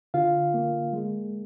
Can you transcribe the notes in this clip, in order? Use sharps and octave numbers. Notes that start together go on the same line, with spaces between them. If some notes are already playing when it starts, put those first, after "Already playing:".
D3 F4 F5
A#3
G#3